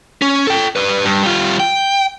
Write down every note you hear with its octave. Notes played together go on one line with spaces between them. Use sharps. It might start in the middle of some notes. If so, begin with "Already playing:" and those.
C#4
A4 G5
G3 B4
G2
G3 F4
G5